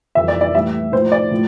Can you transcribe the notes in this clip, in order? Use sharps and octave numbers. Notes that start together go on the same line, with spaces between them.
F2 E3 G3 E5
D5
D5
A2 E3 G3 E5
A2 F3 C5
D5
A2 F3